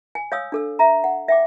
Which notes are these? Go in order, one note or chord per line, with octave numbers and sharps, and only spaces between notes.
G#5
C#5 F5 D#6 E6
D4 A4 E6
E5 A#5
F#5
E5 G5 D6